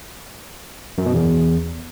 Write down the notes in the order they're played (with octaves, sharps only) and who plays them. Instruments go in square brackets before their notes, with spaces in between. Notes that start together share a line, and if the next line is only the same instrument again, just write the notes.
[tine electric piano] F#2
B2
E2